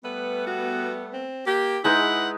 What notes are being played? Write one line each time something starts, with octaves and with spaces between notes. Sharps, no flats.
G3 A3 B3 B4
F#4
C4
A#3 G4
G#3 D#4 E4 G#4 B4 F#5